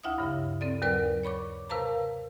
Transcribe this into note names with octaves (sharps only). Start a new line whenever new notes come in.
D2 E4 E5 F5 D#6
G2 C#3
C4 A4 D5
D#2 F#3 A#4 B4 D5
C#5 B5 C#6 D6
C3 A#4 B4 F5 A5 A#5